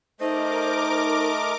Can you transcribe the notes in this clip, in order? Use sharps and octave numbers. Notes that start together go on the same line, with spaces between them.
A3 D#4 A#4 C5 D#5 D6